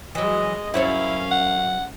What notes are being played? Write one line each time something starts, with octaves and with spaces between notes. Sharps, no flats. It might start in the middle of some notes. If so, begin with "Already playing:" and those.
E3 F#3 G#3 D#5
F#2 C#4 E4 C5 C#5 F5
F#5